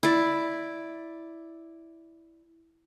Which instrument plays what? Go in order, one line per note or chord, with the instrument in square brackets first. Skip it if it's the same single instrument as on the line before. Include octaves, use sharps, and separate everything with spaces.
[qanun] E4 D5